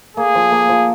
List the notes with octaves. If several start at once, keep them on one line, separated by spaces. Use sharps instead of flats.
A#3 G#4
F3
A#3
F3